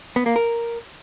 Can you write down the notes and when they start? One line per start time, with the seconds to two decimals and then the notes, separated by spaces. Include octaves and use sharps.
0.16 B3
0.26 A#3
0.36 A#4